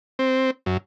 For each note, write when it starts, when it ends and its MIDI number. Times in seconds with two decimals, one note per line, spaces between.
0.19 0.51 60
0.66 0.77 42